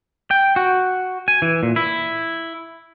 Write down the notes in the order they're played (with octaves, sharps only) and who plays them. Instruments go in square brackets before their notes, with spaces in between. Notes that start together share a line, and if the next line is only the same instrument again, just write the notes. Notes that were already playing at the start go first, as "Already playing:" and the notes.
[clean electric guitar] G5
F#4
G#5
E3
A#2
E4